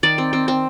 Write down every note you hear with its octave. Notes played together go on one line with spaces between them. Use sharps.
D#3 D5
C4
C4
C4